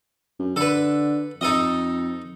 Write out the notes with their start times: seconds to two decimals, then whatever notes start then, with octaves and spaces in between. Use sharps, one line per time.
0.39 F#2
0.56 D3 A4 B4
1.41 F2 D#4 A4 D#5